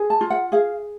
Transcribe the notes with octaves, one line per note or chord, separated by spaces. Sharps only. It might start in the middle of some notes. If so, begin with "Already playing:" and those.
Already playing: G#4
A5
F4
F#5
G#4 F5